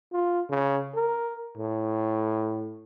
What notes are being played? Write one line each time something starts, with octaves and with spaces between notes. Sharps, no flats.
F4
C#3
A#4
A2